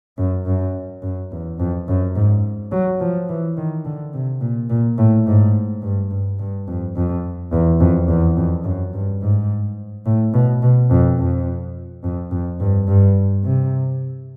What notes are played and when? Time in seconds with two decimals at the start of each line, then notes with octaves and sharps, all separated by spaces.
0.18 F#2
0.46 F#2
1.02 F#2
1.32 E2
1.59 F2
1.88 F#2
2.16 G#2
2.72 F#3
3.00 F3
3.29 E3
3.57 D#3
3.85 D3
4.13 C3
4.41 A#2
4.70 A#2
4.98 A2
5.27 G#2
5.82 G2
6.11 G2
6.39 G2
6.68 F2
6.96 F2
7.52 E2
7.80 F2
8.08 E2
8.37 F2
8.64 F#2
8.94 G2
9.22 G#2
10.05 A2
10.34 B2
10.63 B2
10.90 F2
11.19 F2
12.04 F2
12.31 F2
12.60 G2
12.87 G2
13.44 C3